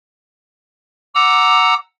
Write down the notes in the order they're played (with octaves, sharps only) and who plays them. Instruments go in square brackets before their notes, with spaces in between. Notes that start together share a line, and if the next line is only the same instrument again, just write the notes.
[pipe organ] F#5 A#5 E6 [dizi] D6